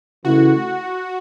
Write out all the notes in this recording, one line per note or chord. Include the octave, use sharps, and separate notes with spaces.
C#3 E3 A3 E4 F#4